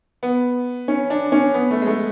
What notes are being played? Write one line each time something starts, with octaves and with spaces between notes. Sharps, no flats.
B3
C#4
D4
C#4
B3
A3
G#3
A3